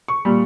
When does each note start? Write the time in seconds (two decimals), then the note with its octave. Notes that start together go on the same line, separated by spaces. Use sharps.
0.08 C#6
0.25 A#2 G3